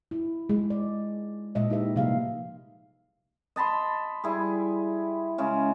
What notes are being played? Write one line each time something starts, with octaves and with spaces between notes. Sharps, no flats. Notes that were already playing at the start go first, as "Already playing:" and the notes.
E4
G#3 G#4
D5
A#2 G#3 D#5 E5
D#4 E4 G4 B4 E5
C3 F3 G3 A#3 G#4 F5
D#5 A5 B5 C6
G3 E4 G#4
C#3 G#3 C#4